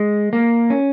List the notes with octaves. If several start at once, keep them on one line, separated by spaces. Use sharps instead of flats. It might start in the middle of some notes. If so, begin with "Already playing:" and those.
Already playing: G#3
A#3
C#4